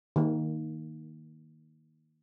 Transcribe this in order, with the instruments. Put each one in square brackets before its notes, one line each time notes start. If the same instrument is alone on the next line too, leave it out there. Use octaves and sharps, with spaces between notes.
[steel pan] D#3 A#3